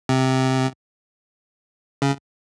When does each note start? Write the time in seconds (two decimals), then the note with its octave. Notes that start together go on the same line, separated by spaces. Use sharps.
0.09 C3
2.02 C#3